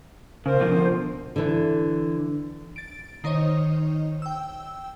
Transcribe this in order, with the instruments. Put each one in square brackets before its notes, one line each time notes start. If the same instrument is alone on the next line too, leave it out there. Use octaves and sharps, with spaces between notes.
[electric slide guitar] C#3 [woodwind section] A#4 C5
[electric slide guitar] B2 D3 F3
[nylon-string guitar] D3 E3
[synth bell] A6 D7
D#3 D#4 C5 C#5 D#5
G5 E6